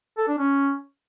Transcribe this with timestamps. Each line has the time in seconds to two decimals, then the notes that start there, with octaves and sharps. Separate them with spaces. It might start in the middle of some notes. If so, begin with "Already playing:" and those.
0.18 A4
0.28 D4
0.38 C#4